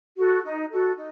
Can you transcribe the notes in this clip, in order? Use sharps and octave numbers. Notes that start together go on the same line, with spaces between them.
F#4 A4
D#4
F#4 A4
D#4